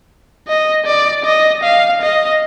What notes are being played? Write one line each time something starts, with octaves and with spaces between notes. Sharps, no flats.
D#5
D5
D#5
F5
D#5